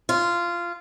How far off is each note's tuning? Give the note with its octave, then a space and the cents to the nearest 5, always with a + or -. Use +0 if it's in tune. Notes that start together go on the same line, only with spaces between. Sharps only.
F4 -15